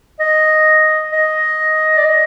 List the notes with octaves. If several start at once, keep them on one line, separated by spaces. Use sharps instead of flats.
D#5
D#5
D5
D#5